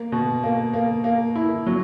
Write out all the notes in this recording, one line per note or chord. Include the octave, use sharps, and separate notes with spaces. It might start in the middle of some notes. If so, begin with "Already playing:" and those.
Already playing: A#3
B2
A#3
A#3
A#3
E4
F#3